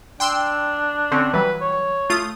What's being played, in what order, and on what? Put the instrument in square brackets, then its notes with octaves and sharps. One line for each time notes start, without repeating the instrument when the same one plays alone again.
[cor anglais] D4 [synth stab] G5 C6 E6
[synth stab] D3 C4 C#4
[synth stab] E3 F#3 G3 [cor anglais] B4
[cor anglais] C#5
[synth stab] A3 F4 D#6